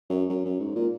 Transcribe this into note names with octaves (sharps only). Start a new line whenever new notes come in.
F#2
F#2
F#2
G#2
A#2